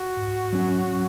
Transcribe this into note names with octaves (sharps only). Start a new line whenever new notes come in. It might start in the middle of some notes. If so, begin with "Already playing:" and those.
Already playing: F#4
G#2
F#3 C#4